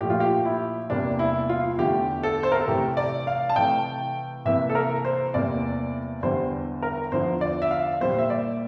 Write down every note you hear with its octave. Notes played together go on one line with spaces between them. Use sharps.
A#2 F3 A3 G4
F4
G4
E4
E2 C3 G3 A#3 D4
E4
F4
E2 D3 A3 G4
A4
C5
A#4
A4
C3 E3 A3 G4
D5
F5
A5
C3 E3 A3 G5
C3 E3 A#3 E5
A4
A#4
C5
E2 C3 G3 A#3 D5
E2 D3 G3 C5
A#4
E2 D3 F3 C5
D5
E5
F5
A#2 G3 A#3 C5
E5
D5